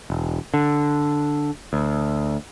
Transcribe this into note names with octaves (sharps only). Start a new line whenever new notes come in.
E1
D3
D2